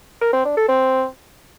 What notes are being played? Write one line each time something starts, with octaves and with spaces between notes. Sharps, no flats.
A#4
C4
D4
A4
C4